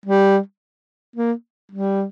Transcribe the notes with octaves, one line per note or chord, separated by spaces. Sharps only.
G3
A#3
G3